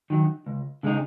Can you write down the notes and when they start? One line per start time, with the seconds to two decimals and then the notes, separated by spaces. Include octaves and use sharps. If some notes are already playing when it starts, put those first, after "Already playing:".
0.10 D#3 F#3
0.46 C#2
0.83 C#3 G#3 D#4